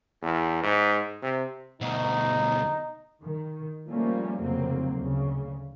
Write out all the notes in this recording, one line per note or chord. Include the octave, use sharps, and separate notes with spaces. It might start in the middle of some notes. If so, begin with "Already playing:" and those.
E2
G#2
C3
D2 B2 D#4
D#3
F3 G3 A3 A#3 C#4
F1 F2 C#3 F#3 A#3 C4
D2 C#3